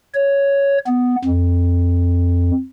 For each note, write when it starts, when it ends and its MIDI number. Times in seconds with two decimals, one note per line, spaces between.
0.14 0.78 73
0.87 1.16 59
1.25 2.51 41